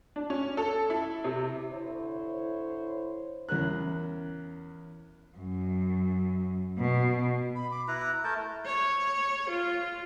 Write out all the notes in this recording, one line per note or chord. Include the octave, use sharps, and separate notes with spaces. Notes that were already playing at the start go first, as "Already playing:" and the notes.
D4
C#4
A4
E4
C3
D3 E4 C5 C#5
E2 C#4 A#4 F#6
F#2
B2
B5
D6
E4 B4 A#5 F#6
A3 A#4 A5 G6
C#5
F4